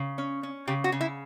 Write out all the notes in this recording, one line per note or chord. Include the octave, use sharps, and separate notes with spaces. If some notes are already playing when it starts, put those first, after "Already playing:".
Already playing: C#3
C#4
C#4
C#3 G4
F#4
C#3
E4